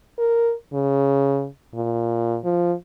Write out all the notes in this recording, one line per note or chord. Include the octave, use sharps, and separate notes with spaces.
A#4
C#3
A#2
F3